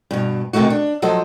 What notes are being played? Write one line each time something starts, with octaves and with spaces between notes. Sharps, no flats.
G2 B2
C3 D#3 A3 D#4 F#4
D4
F3 F#3 A4 C5 D#5